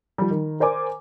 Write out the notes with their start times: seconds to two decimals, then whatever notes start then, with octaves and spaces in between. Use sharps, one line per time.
0.18 F3 G3
0.30 D#3
0.60 A#4 C5 D5 G#5 D6